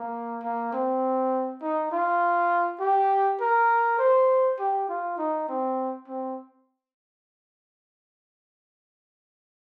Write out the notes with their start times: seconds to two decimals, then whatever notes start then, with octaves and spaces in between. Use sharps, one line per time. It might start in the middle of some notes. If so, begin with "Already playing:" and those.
Already playing: A#3
0.43 A#3
0.72 C4
1.61 D#4
1.92 F4
2.80 G4
3.41 A#4
3.99 C5
4.59 G4
4.89 F4
5.18 D#4
5.48 C4
6.08 C4